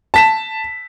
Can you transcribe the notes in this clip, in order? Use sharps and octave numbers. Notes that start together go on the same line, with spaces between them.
A5 B6 E7